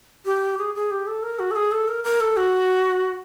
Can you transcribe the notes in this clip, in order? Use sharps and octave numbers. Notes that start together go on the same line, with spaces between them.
G4
G#4
G#4
G4
A4
A#4
F#4
A4
G#4
A4
A#4
A#4
A4
F#4